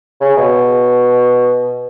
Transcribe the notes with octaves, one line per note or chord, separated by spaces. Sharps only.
C#3
B2